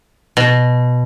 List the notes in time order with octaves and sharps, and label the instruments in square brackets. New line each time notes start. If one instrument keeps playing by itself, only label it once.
[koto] B2